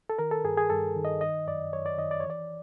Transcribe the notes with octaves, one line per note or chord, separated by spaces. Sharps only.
A4
D#3 A#4
A4
G2 G#4
G#4
G2 A4
D#3
D#5
D#3 D#5
F#2 D5
F#2 C#5
D5
D#3 D#5
D5
E3 C#5
D5